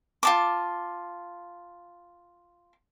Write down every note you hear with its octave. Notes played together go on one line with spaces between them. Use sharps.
F4 A5 D6